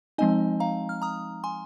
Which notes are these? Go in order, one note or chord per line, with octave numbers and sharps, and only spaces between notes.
F3 G#3 C4 D#4 D#5 G#5
F5 A#5
F6
A#5 D#6
G#5 C6